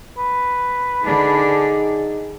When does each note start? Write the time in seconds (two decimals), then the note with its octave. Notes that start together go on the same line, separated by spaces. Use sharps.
0.18 B4
1.04 D3 D4 D#4 G#4